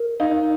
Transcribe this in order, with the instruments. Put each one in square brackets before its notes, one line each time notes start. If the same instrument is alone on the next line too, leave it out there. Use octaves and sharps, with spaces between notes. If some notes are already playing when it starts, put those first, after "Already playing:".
Already playing: [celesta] A#4
[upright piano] D#4 [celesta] F5